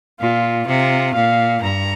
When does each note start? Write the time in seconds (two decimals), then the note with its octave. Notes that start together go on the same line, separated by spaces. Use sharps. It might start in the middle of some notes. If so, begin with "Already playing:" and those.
0.20 A#2 F4
0.67 C3 F4
1.14 A#2 F5
1.62 G2 A#5